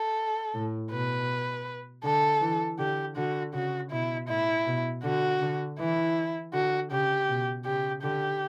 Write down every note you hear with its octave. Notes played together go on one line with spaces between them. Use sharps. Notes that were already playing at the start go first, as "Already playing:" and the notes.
Already playing: A4
A2
B2 B4
D3 A4
E3
D3 G4
D3 F#4
C#3 F#4
B2 E4
A2 E4
B2
D3 F#4
D3
E3 E4
D3 F#4
C#3 G4
B2
C#3 G4
D3 G4